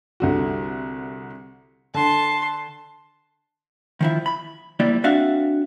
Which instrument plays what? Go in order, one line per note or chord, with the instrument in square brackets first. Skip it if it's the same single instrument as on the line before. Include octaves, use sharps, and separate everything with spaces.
[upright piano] C2 D3 F#4
[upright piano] D3 [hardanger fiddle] A5 C6
[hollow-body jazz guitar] D#3 F3 E4
B5
F3 G3 A#3 E4 D5
C4 D4 F#4 E5 F5